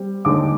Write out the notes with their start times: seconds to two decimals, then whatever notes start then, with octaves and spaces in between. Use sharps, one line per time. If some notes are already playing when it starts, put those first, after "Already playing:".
Already playing: G3 C4
0.25 D#2 D3 G#3 D#4 D6